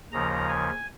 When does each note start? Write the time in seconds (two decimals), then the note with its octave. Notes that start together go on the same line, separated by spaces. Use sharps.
0.12 D#2 C#3 F3 A#5
0.48 G#5